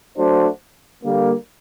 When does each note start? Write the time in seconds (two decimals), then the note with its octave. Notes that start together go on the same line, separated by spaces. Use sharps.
0.17 F#3 A3 D4 F#4 C5
1.03 D3 G3 A#3